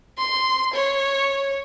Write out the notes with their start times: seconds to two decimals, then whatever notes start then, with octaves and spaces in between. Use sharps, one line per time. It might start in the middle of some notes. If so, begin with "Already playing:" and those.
0.18 C6
0.74 C#5